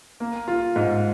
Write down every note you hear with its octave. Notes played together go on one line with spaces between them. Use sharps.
A#3
F4
G#2